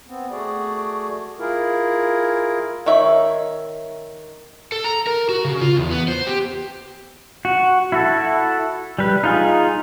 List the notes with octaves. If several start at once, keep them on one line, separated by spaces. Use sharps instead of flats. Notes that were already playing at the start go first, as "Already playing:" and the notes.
B3 C4
A3 F#4 G#4 D5
E4 F4 G#4 A#4
D#3 C#5 E5
A4
A#5
A#4
F#4
C#3
F4
E2
B3
C5
G4
F#4
E4 F#4 A4
G3 B4
D#4 F4 G#4